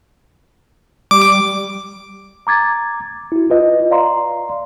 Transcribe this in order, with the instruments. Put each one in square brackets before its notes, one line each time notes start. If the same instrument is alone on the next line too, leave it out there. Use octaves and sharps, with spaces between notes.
[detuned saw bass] G3 [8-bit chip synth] D6
[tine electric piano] A#5 D6 G#6 A6
E4 F#4
F4 B4 D#5
D5 F5 A#5 C6